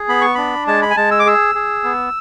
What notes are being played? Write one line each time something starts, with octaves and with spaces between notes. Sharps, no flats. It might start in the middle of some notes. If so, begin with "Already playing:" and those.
Already playing: G#4
B3 B5
C#6
D4 B5
G#3 A5
B5
G#5
G#3 A5
E6
D6
G#4 E6
G#4
B3